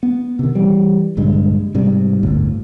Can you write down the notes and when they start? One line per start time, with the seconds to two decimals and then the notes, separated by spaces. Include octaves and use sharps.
0.03 B3
0.39 C3 D#3
0.55 E3 G3
1.17 A#1 G2 D3 G#3
1.75 G#2 C3 G3
2.23 G1 D2 A2